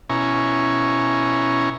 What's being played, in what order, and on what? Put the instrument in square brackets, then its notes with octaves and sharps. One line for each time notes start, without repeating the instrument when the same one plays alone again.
[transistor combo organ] B2 C#4 E4 G#5 A#5 C#6